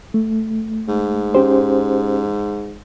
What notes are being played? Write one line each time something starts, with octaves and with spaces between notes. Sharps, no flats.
A3
G#2
C#4 G4 C5